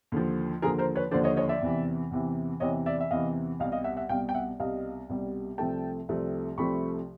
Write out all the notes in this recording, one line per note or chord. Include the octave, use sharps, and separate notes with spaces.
D#2 D3 F3
D#2 D3 F3 G#4 A#4
A#4 C5
B4 C#5
D#2 D3 F3 C5 D5
C#5 D#5
C#5 D#5
D5 E5
E2 C3 E3
E2 C3 E3
E2 C3 E3 C#5 D#5
D5 E5
E5
E2 C3 E3 D#5 F5
C2 B2 G3 D#5 F5
D#5 F5
E5 F#5
E5 F#5
C2 B2 G3 F5 G5
G5
E5 F#5
C2 B2 G3 D#5 F5
C2 B2 G3
C2 C3 F3 A3 G5 A5
C2 C3 F3 A3
C2 C3 F3 A3 B5 C#6